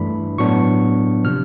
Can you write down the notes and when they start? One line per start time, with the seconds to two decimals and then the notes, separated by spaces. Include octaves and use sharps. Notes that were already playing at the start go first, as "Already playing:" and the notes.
Already playing: G2 E3 A3 D4 B5
0.38 A2 F#3 B3 D4 C#6
1.24 C3 F3 F6